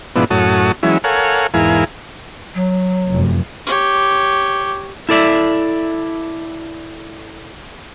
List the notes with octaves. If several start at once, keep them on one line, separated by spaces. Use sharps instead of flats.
G#2 B2 F3 B3 D4 E4
F#2 A2 F#4 C#5 A5 D#6
E3 F#3 G#3 C#4 E4
A4 A#4 C#5 F5 F#5 G#5
E2 G#2 E4 A#4 F5 G#5
F#3
F1 F#2
G4 C#5
E4 A4 D5 E5